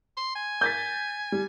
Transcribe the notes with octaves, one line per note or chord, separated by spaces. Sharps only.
C6
G#5
G6 A6 B6
G3